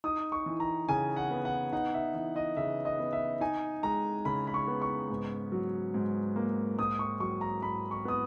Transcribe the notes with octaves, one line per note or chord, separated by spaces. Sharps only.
D#4 D#6
C#6
E3
A#5
C#3 G#5
F#5
B3
F#5
D#4 F#5
E5
E3 E5
D#5
C#3 E5
D#5
B3
E5
D#4 G#5
G#3 A#5
C#3 B5
B5
C#6
B3
C#6
G#2
F#3
G#2
A#3
G#2 D#6
C#6
F#3 C#6
A#5
G#2 B5
C#6
B3 D#6